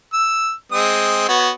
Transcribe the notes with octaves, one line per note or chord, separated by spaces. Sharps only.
E6
G#3 C4 D#6
B3 F#4 C#5